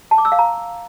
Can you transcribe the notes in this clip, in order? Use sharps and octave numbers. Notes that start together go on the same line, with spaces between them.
A5
D6
E6
F5
A#5